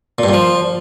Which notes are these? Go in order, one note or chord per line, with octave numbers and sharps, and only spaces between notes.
A#2
G2
A#2
F3